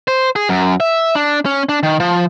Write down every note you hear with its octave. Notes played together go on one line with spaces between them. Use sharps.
C5
G#4
F#2
E5
D4
C#4
D4
D#3
F3